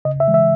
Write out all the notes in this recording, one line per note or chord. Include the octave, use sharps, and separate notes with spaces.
C#3 D#5
E5
E3 G#3
E5